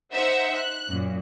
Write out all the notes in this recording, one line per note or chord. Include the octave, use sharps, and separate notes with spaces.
D#4 C5 E5 F#5
F#6
F#2 A#2